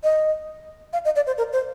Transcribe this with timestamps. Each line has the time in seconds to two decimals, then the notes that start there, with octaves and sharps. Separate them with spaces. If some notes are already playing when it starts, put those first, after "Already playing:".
0.03 D#5
0.93 F5
1.05 D#5
1.16 D5
1.27 C5
1.38 A#4
1.53 C5